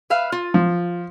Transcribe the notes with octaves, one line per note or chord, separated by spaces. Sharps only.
B4 E5 F5
F4
F3